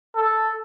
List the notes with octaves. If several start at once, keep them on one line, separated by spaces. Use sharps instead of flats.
A4